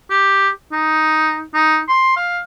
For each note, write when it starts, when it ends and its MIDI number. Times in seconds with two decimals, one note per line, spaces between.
0.10 0.49 67
0.72 1.42 63
1.54 1.80 63
1.89 2.13 84
2.17 2.39 77